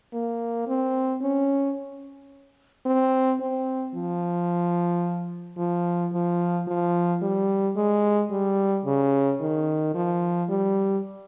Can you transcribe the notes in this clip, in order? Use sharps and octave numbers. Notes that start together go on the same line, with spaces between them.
A#3
C4
C#4
C4
C4
F3
F3
F3
F3
G3
G#3
G3
C#3
D#3
F3
G3